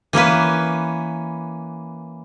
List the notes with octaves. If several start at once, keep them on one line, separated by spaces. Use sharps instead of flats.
E3 A#3 C#4 B4